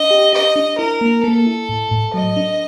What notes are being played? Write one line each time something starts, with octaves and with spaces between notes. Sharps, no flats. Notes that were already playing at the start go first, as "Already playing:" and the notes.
Already playing: D4 D#5
G4
G4 D#5
D4
E4 A#4
A#3
A#3 A4
E4
A2
A2
F#3 D#5
D4